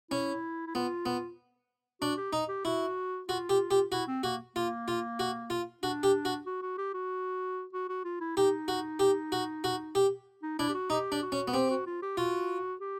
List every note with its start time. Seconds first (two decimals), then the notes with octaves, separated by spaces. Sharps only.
0.11 C#4 E4
0.67 E4
0.75 B3 F4
1.06 B3
2.01 D4 F#4
2.17 G4
2.33 D#4
2.49 G4
2.65 E4 F#4
3.28 F4 F#4
3.49 G4
3.71 G4
3.92 E4 F#4
4.07 C4
4.23 A#3 F#4
4.56 A#3 F4
4.88 F4
5.19 F#4
5.50 F4
5.83 D4 F#4
6.03 G4
6.25 F#4
6.46 F#4
6.62 F#4
6.78 G4
6.94 F#4
7.73 F#4
7.89 F#4
8.04 F4
8.20 E4
8.37 D#4 G4
8.68 F#4
8.99 G4
9.32 F#4
9.64 F#4
9.95 G4
10.43 D#4
10.59 D4 E4
10.69 G4
10.74 F#4
10.90 D#4 G4
11.12 D4
11.22 F#4
11.32 C#4
11.48 B3
11.54 C4 G4
11.70 F#4
11.86 F4
12.02 G4
12.17 F4 F#4
12.81 G4